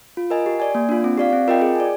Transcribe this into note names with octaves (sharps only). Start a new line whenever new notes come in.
F4
A#4 D#5 G#5
G4
D5 G#5
A#3
D4 F4
C4
G4 D5 F5
C4
F4 A#4 D#5 G5
G#4
D5 G#5